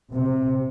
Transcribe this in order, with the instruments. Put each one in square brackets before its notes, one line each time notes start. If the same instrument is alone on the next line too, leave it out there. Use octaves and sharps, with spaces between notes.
[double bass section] C3